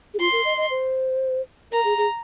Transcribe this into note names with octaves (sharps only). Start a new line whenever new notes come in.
G#4
F4 C6
A#4
D#5
D#5
C5
A#4 A#5
G#4
G#4